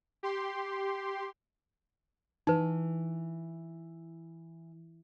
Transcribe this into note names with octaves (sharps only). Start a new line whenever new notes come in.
G4 C6
E3 D#4 B4